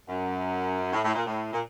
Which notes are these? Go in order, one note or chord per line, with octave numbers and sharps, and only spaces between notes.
F#2
A2
A2
A#2
A2
A#2